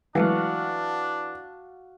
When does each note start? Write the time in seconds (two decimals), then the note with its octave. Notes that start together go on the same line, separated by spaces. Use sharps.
0.15 E3 F#3 G#3 A3 D4 F#4 F5 F#5